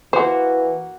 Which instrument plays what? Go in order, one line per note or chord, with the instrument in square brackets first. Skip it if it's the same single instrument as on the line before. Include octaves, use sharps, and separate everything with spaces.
[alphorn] E3 [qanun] A#3 F#4 [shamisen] C5